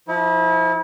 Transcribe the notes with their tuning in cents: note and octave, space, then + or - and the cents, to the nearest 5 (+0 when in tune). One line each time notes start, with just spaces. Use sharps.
F3 -5 E4 -35